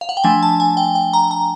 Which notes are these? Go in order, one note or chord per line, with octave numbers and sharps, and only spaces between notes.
F5
F#5
G5
F3 A3 D4 G#5
A5
G#5
G5
G5
A#5
A#5